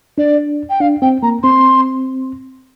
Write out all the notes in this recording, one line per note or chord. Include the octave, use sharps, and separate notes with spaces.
D4 D5
G5
D4 F5
C4 G5
A#3 A#5
C4 C6